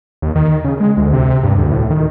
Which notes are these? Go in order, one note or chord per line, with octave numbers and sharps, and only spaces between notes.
D#2
D#3
C#3
G#3
D2
C3
G2
D2
A2
D#3